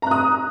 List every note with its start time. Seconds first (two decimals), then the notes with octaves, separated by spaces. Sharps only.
0.02 A#5
0.07 F#6
0.11 D#6